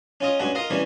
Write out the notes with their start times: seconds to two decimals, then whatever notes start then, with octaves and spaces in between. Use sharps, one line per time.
0.21 C#4 F4 D#5
0.40 G2 G#3 C#4 F#4
0.55 F4 A#4 D#5 F5
0.70 C3 E3 G3 C#4 C#5